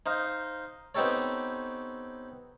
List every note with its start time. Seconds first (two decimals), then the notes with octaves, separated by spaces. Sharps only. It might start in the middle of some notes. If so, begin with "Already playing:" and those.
0.06 D#4 C5 D#5 F5
0.95 B3 C4 D#4 G4 A4 C#5